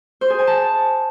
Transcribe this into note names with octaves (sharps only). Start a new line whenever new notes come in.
C5
G#4
G#5
A5